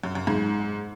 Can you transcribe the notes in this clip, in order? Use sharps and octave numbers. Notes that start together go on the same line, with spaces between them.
F#2
F#2
G#2